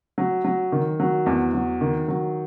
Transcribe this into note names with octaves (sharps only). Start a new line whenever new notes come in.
F#3
F#3
D#3
F#3
E2
F#3
D#3
F#3